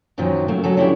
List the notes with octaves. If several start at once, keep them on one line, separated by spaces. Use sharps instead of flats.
F#2 A#2 D#3 F3 F#3
C#3 F#3 A3 A#3
C#3 F#3 G#4 A4
C#3 B3 C#4 D4 E4 G4